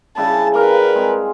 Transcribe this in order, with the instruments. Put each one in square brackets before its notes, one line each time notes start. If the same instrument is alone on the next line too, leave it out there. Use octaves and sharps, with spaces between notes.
[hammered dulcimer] C#3 G3 E4 [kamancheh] A5
[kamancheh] A#4 B4 [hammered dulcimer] D5 F5 A#5
[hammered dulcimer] G#3 C4